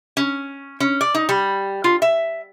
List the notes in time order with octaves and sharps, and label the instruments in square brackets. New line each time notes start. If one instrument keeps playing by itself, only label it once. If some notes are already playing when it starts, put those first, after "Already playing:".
[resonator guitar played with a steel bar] C#4
C#4
D5
D#4
G3
F4
E5